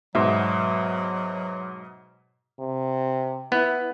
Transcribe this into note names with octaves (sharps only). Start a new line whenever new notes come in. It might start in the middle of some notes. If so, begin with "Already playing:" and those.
G#2 B2 F#3 E5
C3
B3 E4